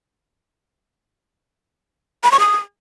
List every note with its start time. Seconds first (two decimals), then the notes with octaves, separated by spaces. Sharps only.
2.23 B5
2.32 C#6
2.40 D#6